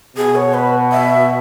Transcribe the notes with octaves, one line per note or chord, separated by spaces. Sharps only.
B2 G#4
C#5
B4
E5